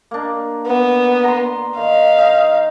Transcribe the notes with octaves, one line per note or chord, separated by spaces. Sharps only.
A#3 D4
B3
A#5 C6
D#3 F5
D#4